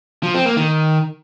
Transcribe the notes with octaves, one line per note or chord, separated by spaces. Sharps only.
F3
C4
A#3
D#3